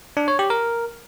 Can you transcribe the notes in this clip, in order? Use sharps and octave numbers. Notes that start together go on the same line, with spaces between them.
D4
C#5
G4
A#4